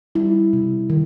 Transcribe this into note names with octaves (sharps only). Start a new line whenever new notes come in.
G3 C4 E4
C3
D#3